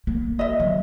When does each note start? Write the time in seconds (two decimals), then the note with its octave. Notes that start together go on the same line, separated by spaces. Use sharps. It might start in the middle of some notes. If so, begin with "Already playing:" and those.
0.07 A#3
0.39 D#5 E5
0.60 C#3 F#3